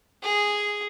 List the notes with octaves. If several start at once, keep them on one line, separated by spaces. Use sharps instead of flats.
G#4